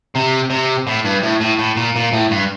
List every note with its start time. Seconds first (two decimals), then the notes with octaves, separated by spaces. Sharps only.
0.15 C3
0.50 C3
0.87 A2
1.05 G2
1.23 A2
1.40 A2
1.59 A2
1.77 A#2
1.96 A#2
2.13 A2
2.31 G2